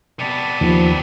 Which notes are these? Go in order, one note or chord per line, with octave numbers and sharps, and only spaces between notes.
C3 B3 D5 A5 B5
D#2 D#3 F3